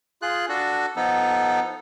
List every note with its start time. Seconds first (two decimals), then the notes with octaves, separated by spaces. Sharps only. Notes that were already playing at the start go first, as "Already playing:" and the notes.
0.22 F4 G#4 F#6
0.49 D4 F#4 A4
0.96 F3 B3 D#4 A4